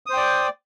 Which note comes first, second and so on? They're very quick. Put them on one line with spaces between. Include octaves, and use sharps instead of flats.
D#6 C5 G5 D5